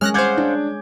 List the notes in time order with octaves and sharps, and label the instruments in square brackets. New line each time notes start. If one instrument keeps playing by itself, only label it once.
[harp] G#3 C#4 [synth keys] F6 F#6 A#6
[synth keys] C5 F5 F#5 [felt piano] D6 G6 G#6
[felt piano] D4